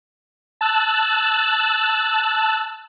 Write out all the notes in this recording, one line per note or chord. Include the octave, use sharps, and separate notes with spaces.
A5 E6 F#6